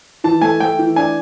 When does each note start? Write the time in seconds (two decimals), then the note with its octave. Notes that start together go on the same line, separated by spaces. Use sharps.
0.24 E3 A5
0.42 A3 G#5
0.60 A3 G5
0.79 E3
0.96 D4 G#5